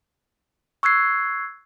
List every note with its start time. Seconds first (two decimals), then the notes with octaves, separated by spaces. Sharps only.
0.83 C#6 E6 F#6 G#6 C7